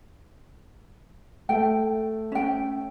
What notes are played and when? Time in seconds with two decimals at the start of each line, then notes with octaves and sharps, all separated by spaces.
1.49 A3 G5
2.32 C#4 G5